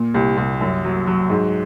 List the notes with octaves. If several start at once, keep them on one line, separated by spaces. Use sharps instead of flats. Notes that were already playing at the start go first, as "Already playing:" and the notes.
Already playing: A#2
C2
C2
F#2
F#3
F#3
G#2